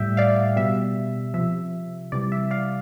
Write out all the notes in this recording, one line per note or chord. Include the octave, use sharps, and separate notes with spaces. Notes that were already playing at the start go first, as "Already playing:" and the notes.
Already playing: A2 G3 E5 G5
D5 F5
B2 G3 E5
C3 F3 E5
C3 E3 G3 D5
E5
D5 F5